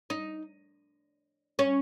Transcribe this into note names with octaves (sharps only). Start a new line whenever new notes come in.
D#4
C#4